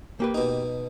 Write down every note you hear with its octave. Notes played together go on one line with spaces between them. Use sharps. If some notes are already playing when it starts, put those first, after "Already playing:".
A#3 G4 B4
B2 D#4